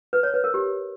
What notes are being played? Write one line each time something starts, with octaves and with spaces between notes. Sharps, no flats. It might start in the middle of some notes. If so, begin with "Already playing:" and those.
B4
C#5
B4
A#4
G4